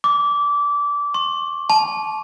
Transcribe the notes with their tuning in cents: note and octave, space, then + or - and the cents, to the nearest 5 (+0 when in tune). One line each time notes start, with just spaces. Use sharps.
D6 -20
C#6 -45
A5 -25